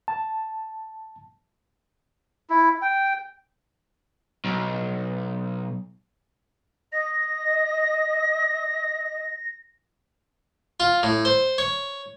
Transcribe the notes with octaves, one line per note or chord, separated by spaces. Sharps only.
A5
E4
G5
B1
D#5 A#6
F4
A2
C5
C#5